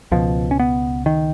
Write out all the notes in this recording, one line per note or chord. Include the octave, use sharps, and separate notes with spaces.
C#2 B2 F3
C#4
B3
D#3